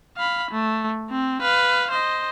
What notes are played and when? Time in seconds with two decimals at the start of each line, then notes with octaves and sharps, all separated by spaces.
0.17 F5 B5
0.51 A3
1.11 C4
1.42 B4 F5
1.91 C5 D#5